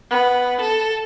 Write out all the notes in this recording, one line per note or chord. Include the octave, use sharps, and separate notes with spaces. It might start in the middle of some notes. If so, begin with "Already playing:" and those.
B3
A4